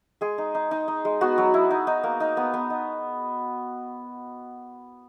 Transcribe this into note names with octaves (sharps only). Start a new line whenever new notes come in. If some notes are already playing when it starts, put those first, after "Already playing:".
G#3 G#4
D#4
D#4
D#4
D#4
G#3
B3 F#4
F#3
E4
D#4
D#4
A#3
D#4
B3
B3
D#4